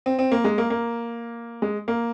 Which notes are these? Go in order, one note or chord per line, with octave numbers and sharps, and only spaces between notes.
C4
C4
A#3
G#3
A#3
A#3
G#3
A#3